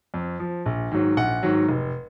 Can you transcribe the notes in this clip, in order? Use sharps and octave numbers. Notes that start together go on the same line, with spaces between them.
F2
F3
A#1
G#2 D#3 F#3
A#1 F#5
G#2 D#3 F#3
F1